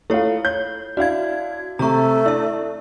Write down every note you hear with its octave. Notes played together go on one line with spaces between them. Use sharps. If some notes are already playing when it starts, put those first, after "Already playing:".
A3 E4 F4 C#5
C#5 G6
D4 E4 F#4 F5 G#6
C3 A3 A#5 C#6
D4 E4 E5